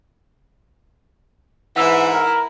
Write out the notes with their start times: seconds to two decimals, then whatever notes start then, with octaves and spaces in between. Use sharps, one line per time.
1.76 G#2 E3 E4 F#5 E6
2.12 A#4